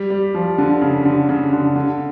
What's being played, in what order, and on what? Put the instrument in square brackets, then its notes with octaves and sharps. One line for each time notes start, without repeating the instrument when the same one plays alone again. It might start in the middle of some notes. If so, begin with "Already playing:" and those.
Already playing: [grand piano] G3
G3
F3
D3
C#3
D3
C#3
D3
D3